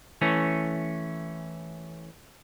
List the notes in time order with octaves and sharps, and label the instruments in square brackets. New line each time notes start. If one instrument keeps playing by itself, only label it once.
[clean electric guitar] E3 A3 C#4